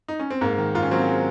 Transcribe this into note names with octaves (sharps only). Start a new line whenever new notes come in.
D#4
C#4
C4
G#2 A#3
D#3
G#2 F4
C#4
F#3 C4
A#3
G#3